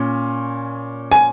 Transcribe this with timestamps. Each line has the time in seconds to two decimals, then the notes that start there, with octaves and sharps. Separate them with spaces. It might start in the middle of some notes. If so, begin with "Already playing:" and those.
Already playing: A#2 C#4
1.12 G#5